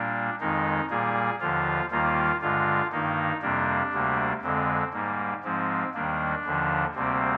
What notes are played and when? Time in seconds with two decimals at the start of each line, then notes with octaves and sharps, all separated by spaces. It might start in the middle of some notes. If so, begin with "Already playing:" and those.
Already playing: A#2 G3 A#3 D4
0.40 F2 D#3 G#3 D#4
0.90 A#2 G3 A#3 G#4
1.40 D#2 D3 F3 F4
1.91 D#2 D#3 G3 A#3 F4
2.41 G2 D3 G#3 F4
2.92 G2 D#3 A#3 D#4
3.42 F2 C3 G3 A#3 D4
3.93 D2 C3 G3 A#3
4.42 F2 D3 G#3 C4
4.93 G#2 G3 A#3
5.44 G#2 F3 G#3 C4
5.94 D#2 D#3 G3 A#3 D4
6.45 D#2 D3 F3
6.95 D2 C3 G3 A#3 C4